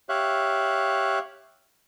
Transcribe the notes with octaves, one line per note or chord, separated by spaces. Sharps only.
G4 C#5 E5 F5 F#6